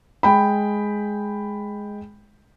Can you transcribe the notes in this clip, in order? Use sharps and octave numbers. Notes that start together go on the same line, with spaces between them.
G#3 G5 B5